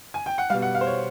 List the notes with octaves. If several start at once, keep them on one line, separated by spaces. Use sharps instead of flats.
G#5
G5
F#5
B2 G3 F5
F#5
F5
C5
C#5